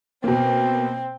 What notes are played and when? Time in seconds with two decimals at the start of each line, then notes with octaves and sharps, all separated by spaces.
0.24 B2 A#3 C4